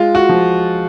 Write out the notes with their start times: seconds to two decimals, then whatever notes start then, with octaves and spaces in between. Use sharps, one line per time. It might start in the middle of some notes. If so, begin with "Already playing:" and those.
Already playing: G#3 F4
0.15 F#4
0.29 F3